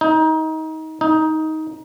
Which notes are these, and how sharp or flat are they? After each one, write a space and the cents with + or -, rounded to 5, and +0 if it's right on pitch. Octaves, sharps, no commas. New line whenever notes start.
D#4 +25
D#4 +15